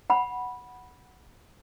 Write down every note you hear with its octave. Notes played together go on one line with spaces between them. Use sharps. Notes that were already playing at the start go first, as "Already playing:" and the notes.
F#5 B5